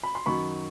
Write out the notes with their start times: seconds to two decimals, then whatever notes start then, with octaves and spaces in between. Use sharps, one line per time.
0.03 B5
0.15 C6
0.26 F#2 D#3 F#3 B5 C#6